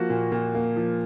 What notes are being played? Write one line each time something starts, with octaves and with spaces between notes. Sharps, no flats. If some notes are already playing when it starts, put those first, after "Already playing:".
Already playing: F3 A#3 F#4
A#2
A#2
A#3
F3